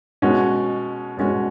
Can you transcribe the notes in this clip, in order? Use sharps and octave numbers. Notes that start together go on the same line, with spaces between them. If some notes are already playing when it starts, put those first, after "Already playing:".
B2 G#3 C#4 F#4
B2 G#3 C#4 F#4